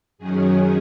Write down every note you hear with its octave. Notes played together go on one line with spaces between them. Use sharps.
F#2 D#3 F#3 C#4 G#4